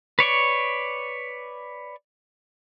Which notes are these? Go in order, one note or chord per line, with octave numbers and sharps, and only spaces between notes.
B4 C#5 D5 C#6